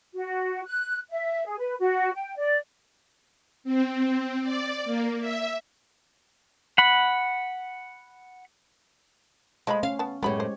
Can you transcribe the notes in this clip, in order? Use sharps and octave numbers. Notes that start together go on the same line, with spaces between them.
F#4
F#6
E5
G#4
B4
F#4
G5
D5
C4
D5
A#3
E5
F#5 B5
F3 G#3 D#5 B5
C#4 F5
B3 A5
F#2 A2 G#3 B3 G4 C#5 B5
C5